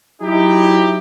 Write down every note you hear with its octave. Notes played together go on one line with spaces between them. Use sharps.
F#3 D#4 E4 G4